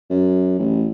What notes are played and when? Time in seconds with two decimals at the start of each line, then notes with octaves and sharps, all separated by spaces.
0.10 F#2
0.59 A1